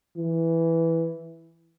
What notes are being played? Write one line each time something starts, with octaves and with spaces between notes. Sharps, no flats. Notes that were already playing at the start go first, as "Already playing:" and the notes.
E3